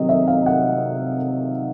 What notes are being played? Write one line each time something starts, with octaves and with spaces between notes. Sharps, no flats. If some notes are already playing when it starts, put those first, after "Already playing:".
Already playing: C3 D#3 F#3 D#5
E5
F5
F#5